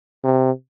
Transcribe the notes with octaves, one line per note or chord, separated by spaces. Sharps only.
C3